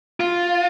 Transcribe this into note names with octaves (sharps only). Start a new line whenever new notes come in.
F4